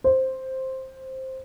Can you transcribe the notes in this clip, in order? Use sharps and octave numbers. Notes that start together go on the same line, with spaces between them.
C5